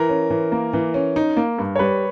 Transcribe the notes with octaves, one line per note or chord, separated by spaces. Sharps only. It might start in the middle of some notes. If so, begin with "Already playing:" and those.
Already playing: E3 A#4
C#4
E3
A#3
E3
C#4
D#4
A#3
G2
C#5
G3 B4